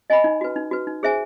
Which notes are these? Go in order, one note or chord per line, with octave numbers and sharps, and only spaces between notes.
D#5 G#5 B5
D#4
F#4 B4
D#4
F#4 B4
D#4
G#4 C5 E5 G#5